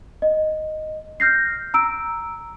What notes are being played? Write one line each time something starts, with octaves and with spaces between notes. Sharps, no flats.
D#5
F6 G6 A#6 C7
A#5 E6 D7